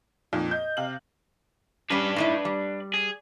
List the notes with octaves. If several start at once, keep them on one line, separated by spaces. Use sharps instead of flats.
F2 A#2 D#4
D#5 G6
C3 F5 F#7
G3 C#4 D4 B4
A2 D#4 E4
G3
G#4